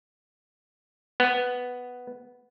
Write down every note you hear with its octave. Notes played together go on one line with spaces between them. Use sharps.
B3